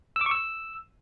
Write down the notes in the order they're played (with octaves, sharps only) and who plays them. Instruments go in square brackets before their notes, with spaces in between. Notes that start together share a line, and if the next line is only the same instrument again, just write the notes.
[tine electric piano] E6
D6
C#6
E6